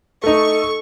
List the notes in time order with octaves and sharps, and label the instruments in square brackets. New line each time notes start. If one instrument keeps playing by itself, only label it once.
[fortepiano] A3 D#4 [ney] A4 [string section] C#6